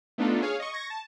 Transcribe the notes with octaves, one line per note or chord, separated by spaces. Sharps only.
A3 B3 D4 D#4 F4 A4
G#4 C#5 F5
D#5 C#6
C#6 G#6 A#6
A5